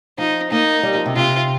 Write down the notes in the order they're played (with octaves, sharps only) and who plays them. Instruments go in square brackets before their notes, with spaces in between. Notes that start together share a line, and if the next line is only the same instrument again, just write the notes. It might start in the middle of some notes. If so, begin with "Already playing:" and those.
[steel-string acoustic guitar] F3 [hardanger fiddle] D#4
[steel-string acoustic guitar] A#3 [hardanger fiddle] D#4
[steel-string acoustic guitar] G3
F3
C3
[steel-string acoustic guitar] C3 [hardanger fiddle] F4